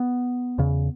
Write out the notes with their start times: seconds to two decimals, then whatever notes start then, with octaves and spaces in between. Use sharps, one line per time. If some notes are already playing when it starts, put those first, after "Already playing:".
Already playing: B3
0.58 E2 C#3